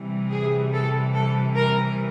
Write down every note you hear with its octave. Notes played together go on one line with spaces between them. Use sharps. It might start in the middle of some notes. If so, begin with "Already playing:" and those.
Already playing: C3 E3 G3
G#4
A4
A4
A#4